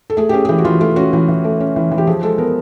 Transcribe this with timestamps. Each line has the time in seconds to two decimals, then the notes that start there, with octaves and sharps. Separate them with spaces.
0.10 A4
0.17 A3 G#4
0.29 G4
0.33 C#4 G#4
0.45 G#4
0.49 E3 G4
0.58 F#4
0.64 E3 F4
0.81 A3 F4
0.96 C#4 F#4
1.13 E3
1.29 E3
1.44 A3
1.60 C#4
1.76 E3
1.91 E3
1.98 G4
2.07 F3 G#4
2.23 G#3 A4
2.38 B3 A#4